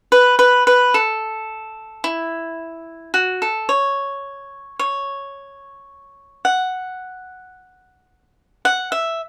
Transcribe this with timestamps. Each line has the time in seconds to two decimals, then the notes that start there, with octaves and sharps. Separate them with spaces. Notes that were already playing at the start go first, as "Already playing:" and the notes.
0.12 B4
0.39 B4
0.67 B4
0.94 A4
2.04 E4
3.14 F#4
3.42 A4
3.69 C#5
4.79 C#5
6.45 F#5
8.65 F#5
8.92 E5